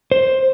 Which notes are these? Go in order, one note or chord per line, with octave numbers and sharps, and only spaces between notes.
C5